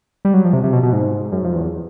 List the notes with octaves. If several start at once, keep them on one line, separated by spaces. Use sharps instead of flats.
G3
F#3
F3
C3
C3
B2
B2
G#2
F#2
F2
E2